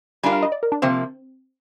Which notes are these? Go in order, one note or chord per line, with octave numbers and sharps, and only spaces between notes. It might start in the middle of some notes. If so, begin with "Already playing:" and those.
G3 D4 F4 A#4 G#5
F5
D#5
D5
A#4
D4
C3 F3 A#3 C4